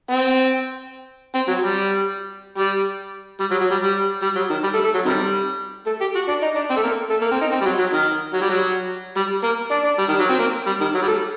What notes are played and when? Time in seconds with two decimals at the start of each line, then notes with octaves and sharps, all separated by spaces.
0.11 C4
1.35 C4
1.48 F#3
1.63 G3
2.58 G3
3.40 G3
3.51 F#3
3.61 F#3
3.71 G3
3.82 G3
4.22 G3
4.36 F#3
4.50 D#3
4.64 G3
4.74 A3
4.84 A3
4.94 F#3
5.05 C3 D#3 G3
5.86 A3
6.01 G4
6.15 F#4
6.28 D4
6.42 D#4
6.55 D4
6.70 C4
6.77 A3
6.83 A#3
7.10 A3
7.21 A#3
7.31 C4
7.41 D#4
7.52 C4
7.61 G3
7.65 F#3
7.79 F#3
7.93 D#3
8.34 F#3
8.41 G3
8.49 F#3
9.16 G3
9.43 A#3
9.71 D4
9.84 D4
9.99 G3
10.09 D#3
10.19 F#3
10.29 C4
10.39 A#3
10.67 G3
10.81 D#3
10.94 F#3
11.02 G3
11.07 A3